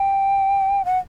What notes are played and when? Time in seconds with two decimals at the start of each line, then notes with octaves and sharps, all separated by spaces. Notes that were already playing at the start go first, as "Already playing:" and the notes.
Already playing: G5
0.85 F#5